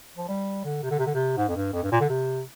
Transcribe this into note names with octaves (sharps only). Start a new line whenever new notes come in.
F3
G3
D3
C3
D3
C3
D3
C3
G#2
F2
G2
F2
G2
A#2
D3
C3